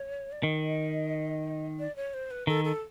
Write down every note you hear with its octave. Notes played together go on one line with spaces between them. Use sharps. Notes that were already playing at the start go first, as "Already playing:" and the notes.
Already playing: C#5
D5
D#3 D#5
D5
C#5
C5
B4
D#3 A4
A4